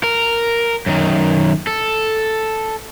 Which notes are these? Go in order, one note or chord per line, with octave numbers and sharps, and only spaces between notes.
A#4
F#2 D#3
A4